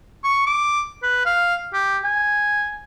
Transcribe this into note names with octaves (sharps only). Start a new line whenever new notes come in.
C#6
D6
B4
F5
G4
G#5